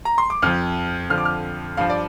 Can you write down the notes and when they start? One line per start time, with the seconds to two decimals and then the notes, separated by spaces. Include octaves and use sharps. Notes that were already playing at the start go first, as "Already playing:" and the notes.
0.05 A#5
0.18 C6
0.30 D6
0.42 F2 F3 F6
1.10 F2 D3 F3 F6
1.18 D6
1.25 F6
1.77 G2 F3 F5
1.90 D5